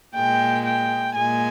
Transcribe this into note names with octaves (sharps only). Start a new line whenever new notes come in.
A#2 G#3 G5
G5
A#2 G#3 G#5